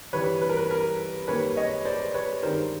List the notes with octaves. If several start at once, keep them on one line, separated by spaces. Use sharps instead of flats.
G2 E3 G3 B4 C#5
B4
A#4
B4
A#4
F#2 D#3 G3 A#3 B4 C#5
C#5 D#5
C5 D5
B4 C#5
G2 D#3 G#3 A#4 C5